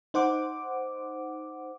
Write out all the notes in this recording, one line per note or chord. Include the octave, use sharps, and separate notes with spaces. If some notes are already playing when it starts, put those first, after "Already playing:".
D#4 C5 F#5 D6